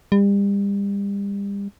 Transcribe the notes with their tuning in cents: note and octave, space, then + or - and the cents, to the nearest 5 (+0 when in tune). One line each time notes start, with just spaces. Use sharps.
G3 +35